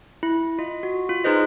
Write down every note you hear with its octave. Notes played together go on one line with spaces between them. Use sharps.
E4
F4 D#5
F#4
F4
D#4 G#4 B4 C5 D#5